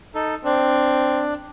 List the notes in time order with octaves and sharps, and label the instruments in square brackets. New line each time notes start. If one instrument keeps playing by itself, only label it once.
[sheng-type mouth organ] D#4 A4
[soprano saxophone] C4 [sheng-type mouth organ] D4